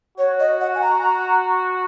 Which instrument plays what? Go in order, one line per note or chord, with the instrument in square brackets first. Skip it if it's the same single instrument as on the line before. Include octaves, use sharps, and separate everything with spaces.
[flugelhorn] F#4 [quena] C#5
[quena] D#5
F#5
G#5
A#5